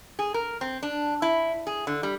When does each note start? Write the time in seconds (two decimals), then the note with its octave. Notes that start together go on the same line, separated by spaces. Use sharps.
0.19 G#4
0.34 A#4
0.61 C4
0.83 D4
1.22 E4
1.67 G#4
1.87 D3
2.03 G3